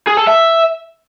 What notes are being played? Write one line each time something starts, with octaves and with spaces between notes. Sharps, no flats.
G#4
A4
E5